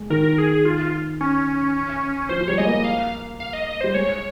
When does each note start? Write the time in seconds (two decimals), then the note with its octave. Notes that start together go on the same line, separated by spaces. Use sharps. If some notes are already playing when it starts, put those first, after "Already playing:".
Already playing: G#3
0.10 D#3 A#4
0.38 G#4
0.65 F4
1.21 C#4
2.29 F3 C5
2.41 F3
2.48 G3 C#5
2.58 G#3 D#5
2.66 A#3
2.84 F5
3.40 F5
3.53 D#5
3.67 D#5
3.81 G3 C5
3.94 G#3 C#5